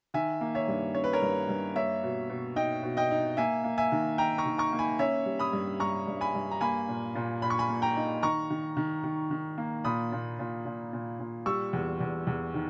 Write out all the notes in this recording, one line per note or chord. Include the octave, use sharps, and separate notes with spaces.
D#3 E5 G#5
A#3
C#5 E5
G2
C#4 C#5
B4
A#4 C#5
G2
G2
A#3 C#5 E5
B2
B2
D#4 D#5 G5
B2
D#5 G5
D#4
A#3 E5 G#5
A#3
E5 G#5
D#3
D#4 G5 A#5
A#5 C#6
D#3
A#5 C#6
A#3
G#5 B5
C#4 C#5 E5
G3
B5 D#6
G2
G2 A#5 C#6
G2
G#5 B5
G2
A#5
A#3 G#5 B5
A#2
A#2
A#2 B5
C#6
G#5 B5
A#3
G5 A#5
D#4
D#3 A#5 C#6
D#3
D#3
D#3
D#3
A#3
A#2 B5 D#6
A#2
A#2
A#2
A#2
A#2
G3 C#6 E6
E2
E2
E2
D#3